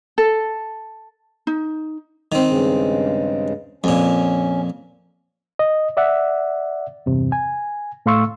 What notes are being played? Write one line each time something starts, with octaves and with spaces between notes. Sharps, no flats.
A4
D#4
D#3 C4
G2 C#3 G#3
F2 A#2 C#4
D#5
D5 E5 F#5
E2 G2 C3
G#5
A2 A3 F5 C6 C#6 E6